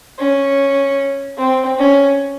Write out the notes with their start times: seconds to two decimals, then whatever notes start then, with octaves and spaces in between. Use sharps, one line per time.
0.18 C#4
1.38 C4
1.79 C#4